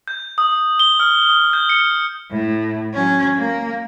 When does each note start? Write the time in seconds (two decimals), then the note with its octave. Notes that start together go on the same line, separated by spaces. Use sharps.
0.08 G6
0.38 D#6
0.80 G7
1.00 F6
1.29 D#6
1.53 G6
1.70 C#7
2.30 A2
2.93 F#3 C#4
3.37 A#3